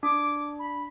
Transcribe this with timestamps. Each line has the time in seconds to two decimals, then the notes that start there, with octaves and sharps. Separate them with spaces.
0.03 D4 D6
0.59 B5